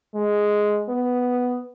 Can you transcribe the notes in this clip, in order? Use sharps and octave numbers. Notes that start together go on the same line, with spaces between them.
G#3
B3